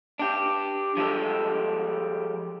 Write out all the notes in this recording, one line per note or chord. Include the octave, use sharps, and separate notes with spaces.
D4 G4
F3 G3 G#3 E4 G4 A4